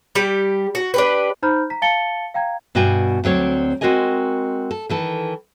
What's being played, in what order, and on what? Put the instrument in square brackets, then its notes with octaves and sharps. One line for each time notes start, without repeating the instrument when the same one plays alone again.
[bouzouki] G3 G4
F#4
D4 G4 B4
[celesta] D#4 C5 A#5 B5 F6 G6
A#5 B6
F5 A5 A6 C#7 G7
F5 G5 A#5 G#6
[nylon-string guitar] G2 B2 F#4 D5 G5 G#5
D2 F#3 C4 C#5 D5
G#3 C4 F#4 A#4 D#5 G#5
A4
D#3 E3 A4